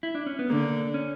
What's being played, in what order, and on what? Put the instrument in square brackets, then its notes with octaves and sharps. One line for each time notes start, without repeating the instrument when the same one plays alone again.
[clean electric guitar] E4
D4
C#4
B3
[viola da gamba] D3 [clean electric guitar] A#3
[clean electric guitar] C#4